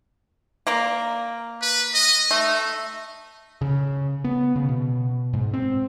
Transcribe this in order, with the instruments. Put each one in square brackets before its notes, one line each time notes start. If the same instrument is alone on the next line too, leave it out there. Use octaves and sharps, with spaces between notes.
[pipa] A#3 D5 A#5
[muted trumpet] B4
D#5
[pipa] A3 [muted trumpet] D#4
[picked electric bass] C#3
B3
C#3
B2
G#2
C4